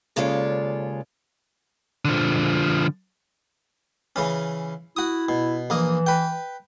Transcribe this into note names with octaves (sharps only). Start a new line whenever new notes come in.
D#2 C#3 G#3 F4 A4 D5
D3 F3
C#3 E3 C#4
E4 F#4 D#6
B2
A#1 E3 A#3 D#5
B4 G5